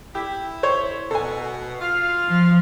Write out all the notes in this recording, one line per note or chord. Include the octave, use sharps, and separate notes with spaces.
E4 G4
C5 C#5
B2 A4 G#5
F4 F5
F3